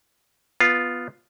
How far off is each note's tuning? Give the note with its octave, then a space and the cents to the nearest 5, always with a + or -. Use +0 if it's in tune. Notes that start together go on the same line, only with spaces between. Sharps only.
B3 +0 F4 +0